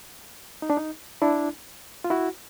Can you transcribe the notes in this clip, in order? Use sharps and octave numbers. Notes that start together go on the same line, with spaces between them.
D#4
D4
D#4
D4 E4
F4
E4 F#4